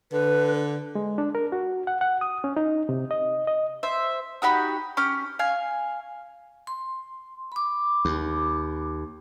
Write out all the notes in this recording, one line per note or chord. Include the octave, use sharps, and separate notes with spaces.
D3 B4
G#3
D4
A#4
F#4
F#5
F#5
D#6
C#4
D#4
C3
D#5
D#5
C5 E5
D#4 F#4 G4 B5
C#4 G4 F6
F5 G#5
C6
B5 D6
D#2